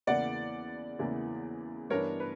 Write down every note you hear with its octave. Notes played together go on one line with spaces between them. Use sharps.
E2 C#3 E3 A#3 D5 F#5
E2 C#3 E3 A#3
G2 E3 B3 D4 A#4 C#5
B4